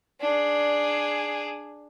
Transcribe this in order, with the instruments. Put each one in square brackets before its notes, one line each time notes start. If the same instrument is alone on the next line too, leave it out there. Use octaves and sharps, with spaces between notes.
[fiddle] D4 G#4